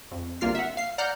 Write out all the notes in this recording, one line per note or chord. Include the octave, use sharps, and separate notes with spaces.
F2
G1 C2 A#3 F4 F6 C7
E5 F#5
F5 C7
D5 F#5 A#5 F6 G6